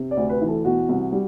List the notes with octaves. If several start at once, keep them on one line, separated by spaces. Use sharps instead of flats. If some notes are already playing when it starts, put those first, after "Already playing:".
Already playing: C3
D5
D2
B4
E3
A4
B2 F#4
C2
G3